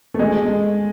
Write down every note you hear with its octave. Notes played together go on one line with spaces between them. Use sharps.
A3
G#3